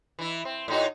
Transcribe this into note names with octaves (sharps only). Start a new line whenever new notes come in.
E3 E4
C4
A2 D#4 F#4